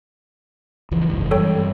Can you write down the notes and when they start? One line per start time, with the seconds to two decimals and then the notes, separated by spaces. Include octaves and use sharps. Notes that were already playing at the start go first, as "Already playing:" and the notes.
0.91 C#2 E3 F3
1.08 F#1 G#2 E3
1.31 G2 E3 G3 A4 C#5 G5